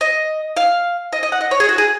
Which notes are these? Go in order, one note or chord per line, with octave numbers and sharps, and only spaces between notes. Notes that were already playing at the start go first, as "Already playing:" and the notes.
D#5
F5
D#5
D#5
F#5
D#5
C#5
G#4
F#4
G#4